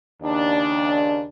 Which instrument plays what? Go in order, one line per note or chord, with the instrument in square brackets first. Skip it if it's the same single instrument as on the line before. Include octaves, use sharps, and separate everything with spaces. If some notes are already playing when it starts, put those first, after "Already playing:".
[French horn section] D#2 C#3 D4